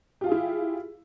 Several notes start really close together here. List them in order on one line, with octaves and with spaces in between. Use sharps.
G4 F4 F5 G#4 E4